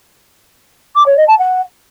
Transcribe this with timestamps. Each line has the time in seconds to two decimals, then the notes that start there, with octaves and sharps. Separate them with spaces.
0.95 D6
1.06 C#5
1.17 D#5
1.27 A5
1.38 F#5